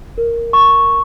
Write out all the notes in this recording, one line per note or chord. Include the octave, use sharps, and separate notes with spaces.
A#4
C#6